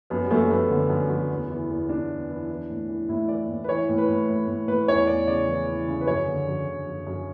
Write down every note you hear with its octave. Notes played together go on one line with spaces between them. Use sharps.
F#2 B3
G3
F#2 A3
A3
F#2 B3
D3
F#2
F#2
E2
E3
E2
E2 D4
E2
E3
E3
A2
E3
A2 E4
E3 D5
A2
B4
E3 C#5
A2
B4
A2
A2
A2
A2 B4
E2 C#5
E2 D5
C#3 D5
E3
E3
C#3
B4
F#2 C#5
D3
F#2
D3
F#2
F#2